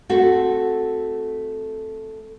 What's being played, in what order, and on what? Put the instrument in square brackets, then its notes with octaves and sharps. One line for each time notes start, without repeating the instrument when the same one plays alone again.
[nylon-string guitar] A3 C4 F#4 A4